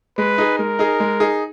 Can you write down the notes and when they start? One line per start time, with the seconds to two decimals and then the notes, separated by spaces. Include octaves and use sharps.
0.18 G#3 B4
0.38 D#4 G#4
0.59 G#3 A#4
0.79 D#4 G#4
1.00 G#3
1.20 D#4 G#4